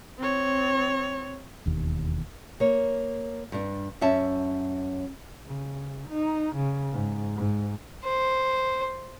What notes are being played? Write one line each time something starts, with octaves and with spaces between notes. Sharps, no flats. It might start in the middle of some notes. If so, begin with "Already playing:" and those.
C4 C#5
E1 D#2
A#3 C#5
G2 D4
F#2 C#4 E5 A5
C#3
D#4
C#3
G#2
G#2
C5